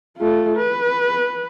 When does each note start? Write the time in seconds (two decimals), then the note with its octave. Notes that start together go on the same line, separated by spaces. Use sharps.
0.17 A3 F4
0.57 B4